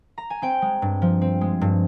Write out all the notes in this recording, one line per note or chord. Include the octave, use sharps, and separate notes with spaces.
A#5
G#5
C4 G5
G#3
G2
F3
C4
G#3
G2